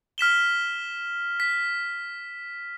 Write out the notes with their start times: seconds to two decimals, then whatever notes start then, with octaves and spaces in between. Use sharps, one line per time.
0.18 F6 B6 E7 G7
1.40 B6